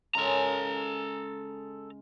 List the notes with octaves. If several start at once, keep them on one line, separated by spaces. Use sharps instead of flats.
C#3 G#3 A4 A#4 A#5